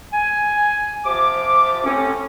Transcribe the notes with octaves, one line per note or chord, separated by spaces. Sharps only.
G#5
C3 F3 F4 D6
A2 C4 C#4